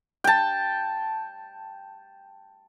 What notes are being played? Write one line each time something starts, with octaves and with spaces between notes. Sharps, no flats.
G5 A5